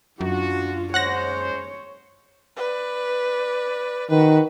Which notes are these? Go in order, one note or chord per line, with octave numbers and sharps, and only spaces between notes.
F#2 D4 F4 F#4
G#3 C#4 C5 C#5 F#5 F#6 A#6
B4 D5
D#3 F#4 B4